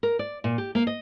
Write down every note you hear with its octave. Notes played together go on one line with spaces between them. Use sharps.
A#4
D5
A#2
G4
A#3
D#5